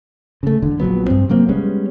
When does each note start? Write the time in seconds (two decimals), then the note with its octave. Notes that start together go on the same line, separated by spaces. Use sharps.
0.43 C#3 A3
0.62 E1 D3
0.80 A#1 F3 F#3 B3
1.06 G2 C4
1.29 C3 F#3 A#3 C4
1.49 G3 G#3 B3 C#4